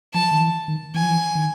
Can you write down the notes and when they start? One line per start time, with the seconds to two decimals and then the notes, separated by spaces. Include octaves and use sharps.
0.14 F3 A5
0.31 D#3
0.40 E3
0.68 D#3
0.94 E3 G#5
1.02 F3
1.09 E3
1.35 D#3